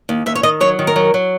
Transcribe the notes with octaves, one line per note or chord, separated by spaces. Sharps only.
D#2
D#2 E5
C#5
D#3 D#5
F#3 C#5
D#3
A#4
F#3
F#3